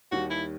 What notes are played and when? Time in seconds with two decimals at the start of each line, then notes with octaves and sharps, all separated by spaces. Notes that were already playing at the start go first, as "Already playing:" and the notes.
0.12 D#2 D#3 G3 F#4
0.30 E4